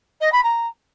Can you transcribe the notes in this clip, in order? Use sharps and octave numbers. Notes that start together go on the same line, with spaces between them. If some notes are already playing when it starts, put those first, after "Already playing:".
D#5
B5
A#5